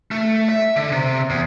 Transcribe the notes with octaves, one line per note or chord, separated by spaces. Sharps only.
A3
E5
D3
C3
E2